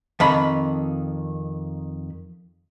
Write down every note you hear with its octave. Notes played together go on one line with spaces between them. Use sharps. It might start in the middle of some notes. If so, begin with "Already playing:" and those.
F2 D#3 B5